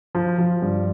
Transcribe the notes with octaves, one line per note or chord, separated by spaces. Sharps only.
F3
F3
G2